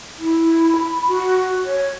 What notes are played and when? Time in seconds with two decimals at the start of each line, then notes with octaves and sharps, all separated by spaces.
0.19 E4
0.76 B5
1.08 F#4
1.66 C#5